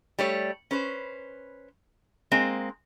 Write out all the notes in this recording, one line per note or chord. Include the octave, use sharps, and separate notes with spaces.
G3 A3 C#5
C#4 B4 C5
G#3 A#3 C4